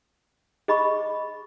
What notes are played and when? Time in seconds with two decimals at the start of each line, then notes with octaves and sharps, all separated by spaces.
0.68 G#4 D#5 B5 C#6